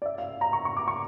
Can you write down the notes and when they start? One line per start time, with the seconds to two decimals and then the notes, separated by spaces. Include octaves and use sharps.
0.02 D5
0.06 E5
0.18 F5
0.41 A#5
0.53 C#6
0.65 C#6
0.77 D6
0.88 C#6